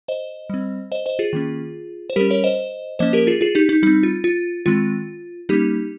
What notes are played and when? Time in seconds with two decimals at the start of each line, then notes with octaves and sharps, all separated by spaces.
0.08 C5 D#5
0.50 G3 C4
0.92 C5 D#5
1.06 C5 D#5
1.19 F4 G#4
1.33 D#3 A#3 C#4
2.10 C5
2.16 G3 C#4 G4 A#4
2.30 A#4 C#5
2.44 C5 D#5
2.99 F3 A#3 C#4 C5 D#5
3.13 G4 A#4
3.27 F4 G#4
3.41 F4 G#4
3.55 D#4 G4
3.69 D#4
3.83 G3 C4 D#4
4.03 F4
4.24 F4
4.66 D#3 G#3 C4 F4
5.49 G3 A#3 C#4 D#4 G4